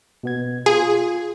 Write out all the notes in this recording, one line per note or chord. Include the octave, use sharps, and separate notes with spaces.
B2 B3 G#6
F4 G#4